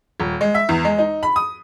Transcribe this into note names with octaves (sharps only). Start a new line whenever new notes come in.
D#1
G#3
E5
E2
G#3
D#4
B5
D#6